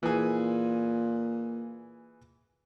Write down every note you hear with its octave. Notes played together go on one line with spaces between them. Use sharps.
A#2 E3 G#4